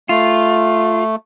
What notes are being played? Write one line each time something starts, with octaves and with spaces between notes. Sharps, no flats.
A3 F4